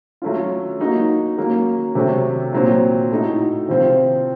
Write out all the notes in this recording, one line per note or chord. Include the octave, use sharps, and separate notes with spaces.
F#3 A3 C#4 F4
F#3 A#3 D#4 F#4
F#3 A#3 C#4 F#4
C3 F#3 A3
A#2 F#3 C4
A2 A3 D#4 F#4
C3 F3 C4 F4